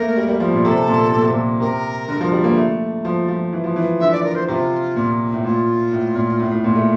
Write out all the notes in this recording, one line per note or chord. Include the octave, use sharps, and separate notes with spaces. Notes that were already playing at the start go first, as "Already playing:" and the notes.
Already playing: A3 A#3 A#4
G3
G3
F3
A#2
C3 A4
A#2
A#2
C3
A#2
C3 A#4
D3
F3
G3
A#3
A3
F3
F3
E3
F3
E3
D3 E5
D5
A#4
C5
C3 F4
A#2
A2
A#2 F4
A2
A#2
A2
A2
A#2
A3